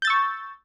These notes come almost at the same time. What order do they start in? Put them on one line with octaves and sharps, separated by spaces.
G6 A6 E6 C#6